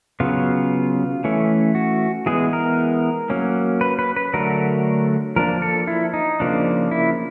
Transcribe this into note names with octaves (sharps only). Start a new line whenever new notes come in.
C#3 F#3 B3 F4
E3 A3 C#4
F#4
E3 G#3 B3 G#4
A#4
F#3 A#3 C#4
B4
B4
B4
D3 F#3 A3 D4 A#4
F3 A#3 D4 A#4
A4
E4
D#4
C#3 F3 A#3 D4
E4